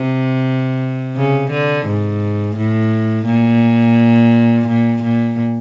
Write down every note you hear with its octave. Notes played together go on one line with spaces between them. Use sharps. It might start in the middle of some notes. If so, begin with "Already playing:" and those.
Already playing: C3
C#3
D3
G#2
A2
A#2
A#2
A#2